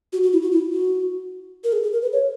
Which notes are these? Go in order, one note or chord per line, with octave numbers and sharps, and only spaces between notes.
F#4
F#4
E4
F#4
E4
F#4
A#4
G#4
G#4
A#4
B4
C#5